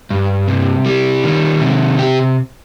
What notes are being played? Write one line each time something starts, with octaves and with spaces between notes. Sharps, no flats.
G2
C3
G3
D#3
C3
G4